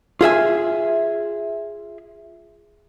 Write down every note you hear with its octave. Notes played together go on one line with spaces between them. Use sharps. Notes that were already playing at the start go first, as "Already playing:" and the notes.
F4 G#4 E5 G#5